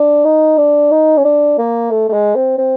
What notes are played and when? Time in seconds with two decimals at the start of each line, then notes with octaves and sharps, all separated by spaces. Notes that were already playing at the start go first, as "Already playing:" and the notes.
Already playing: D4
0.25 D#4
0.58 D4
0.91 D#4
1.18 C#4
1.25 D4
1.58 A#3
1.91 A3
2.09 A3
2.13 G#3
2.36 C4
2.58 C4